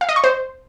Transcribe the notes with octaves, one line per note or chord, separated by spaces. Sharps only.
F5
D#5
C#6
C5